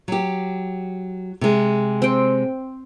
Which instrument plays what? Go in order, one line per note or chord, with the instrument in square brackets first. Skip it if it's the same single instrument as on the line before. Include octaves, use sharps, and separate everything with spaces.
[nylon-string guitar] F#3 G4
C3 G#3
[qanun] C4 G5